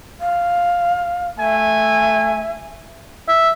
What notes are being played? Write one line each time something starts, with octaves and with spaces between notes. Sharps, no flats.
F5
A3 E5 G#5
E5